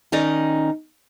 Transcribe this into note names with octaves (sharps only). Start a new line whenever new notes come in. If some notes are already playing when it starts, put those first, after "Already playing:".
D#3 C#4 D#4 D5 D#5